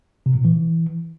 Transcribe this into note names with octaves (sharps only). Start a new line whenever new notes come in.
C3
A#2
E3